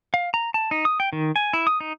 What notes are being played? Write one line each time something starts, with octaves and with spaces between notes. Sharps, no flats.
F5
A#5
A5
D#4
D#6
G5
D#3
G#5
E4
D#6
D#4